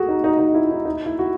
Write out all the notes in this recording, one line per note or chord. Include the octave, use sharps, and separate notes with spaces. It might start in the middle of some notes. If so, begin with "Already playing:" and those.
Already playing: F#4 G#4 A4
D#4
D#4
D#4
E4
D#4
D#4
E4
F#4